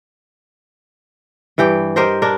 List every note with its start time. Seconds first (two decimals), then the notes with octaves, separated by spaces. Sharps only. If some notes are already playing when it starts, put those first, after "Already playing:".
1.58 G2 E3 G4 G5
1.96 G4 A#4 C5 D#5
2.22 D4 A#4